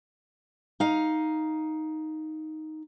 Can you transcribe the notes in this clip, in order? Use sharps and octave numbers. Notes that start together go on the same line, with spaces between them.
D#4 F5